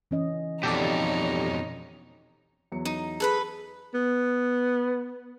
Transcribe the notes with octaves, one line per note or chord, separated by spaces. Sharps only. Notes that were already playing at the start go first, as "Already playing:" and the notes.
E3 C#4 D#5
F2 B2 D#4 G4 A4 C#5 D5
E2 F#3 C#7
D#4
G#4 A4 B4 B5
B3